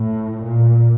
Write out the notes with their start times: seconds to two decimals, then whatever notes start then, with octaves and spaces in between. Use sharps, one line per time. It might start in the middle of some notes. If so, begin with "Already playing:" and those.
Already playing: A2
0.42 A#2